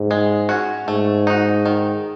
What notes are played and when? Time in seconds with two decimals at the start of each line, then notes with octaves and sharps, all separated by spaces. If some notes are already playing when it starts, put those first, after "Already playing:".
Already playing: G#2
0.11 G#3
0.49 C#4 F#4
0.88 G#2 A3
1.27 D#4 F#4
1.66 D#3